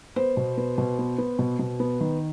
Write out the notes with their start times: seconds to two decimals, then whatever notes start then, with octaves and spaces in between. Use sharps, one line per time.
0.16 B3 C5
0.37 B2
0.57 B3
0.78 B2
0.99 B3
1.18 B3
1.39 B2
1.59 B2
1.80 B3
2.01 D#3